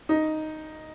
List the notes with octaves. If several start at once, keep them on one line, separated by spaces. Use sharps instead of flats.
D#4